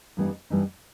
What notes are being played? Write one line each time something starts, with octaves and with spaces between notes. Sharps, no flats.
G2 E3 G3 B3 D#4
G2 E3 G3 B3 D#4